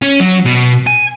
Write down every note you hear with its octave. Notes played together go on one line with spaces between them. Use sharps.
C#4
F#3
B2
G#5